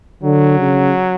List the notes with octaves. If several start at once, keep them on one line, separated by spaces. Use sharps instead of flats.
D3 F#3
C#3